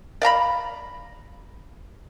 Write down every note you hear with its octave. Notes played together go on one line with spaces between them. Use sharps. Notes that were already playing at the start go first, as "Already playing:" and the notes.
D5 F5 A#5 B5